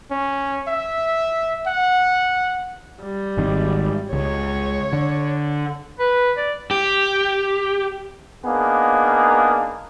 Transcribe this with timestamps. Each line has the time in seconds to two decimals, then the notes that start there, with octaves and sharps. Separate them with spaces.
0.11 C#4
0.68 E5
1.67 F#5
3.02 G3
3.37 G#1 D#3
4.13 C#2 C#5
4.93 D3
5.99 B4
6.37 D5
6.71 G4
8.45 A#3 B3 D4 D#4 G#4